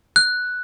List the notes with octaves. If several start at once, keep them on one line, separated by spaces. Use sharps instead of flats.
F#6